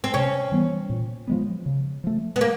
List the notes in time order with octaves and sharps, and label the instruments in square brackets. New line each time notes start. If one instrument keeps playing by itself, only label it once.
[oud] C4
[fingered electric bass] C3 [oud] C#4
[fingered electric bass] E3 G3 B3
A#2
F3 G#3 B3
C#3
F3 A3
[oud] B3
A#3